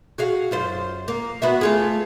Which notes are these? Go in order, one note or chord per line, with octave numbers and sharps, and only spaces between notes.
F#4 G#4 F5
F#2 F4 C5
A#3
B3 F#4 E5
A3 F4 G#4